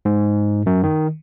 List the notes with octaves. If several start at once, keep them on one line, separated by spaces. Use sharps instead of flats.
G#2
F#2
D#3